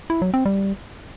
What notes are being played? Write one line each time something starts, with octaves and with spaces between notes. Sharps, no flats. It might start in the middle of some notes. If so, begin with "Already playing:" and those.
E4
F#3
C4
G3